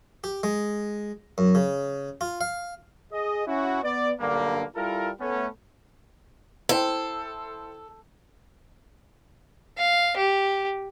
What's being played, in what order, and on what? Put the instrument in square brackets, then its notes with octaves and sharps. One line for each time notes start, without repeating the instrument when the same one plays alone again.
[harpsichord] G4
G#3
F#2
C#3
F4
F5
[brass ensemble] G#4 D#5
C#4 E4 F#4
B3 D5
B1 G2 D3 G3 A#3
G3 E4 F4 A4 A#4
A3 B3 C#4
[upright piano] E4 C5 G5 [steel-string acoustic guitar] A4
[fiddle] F5
G4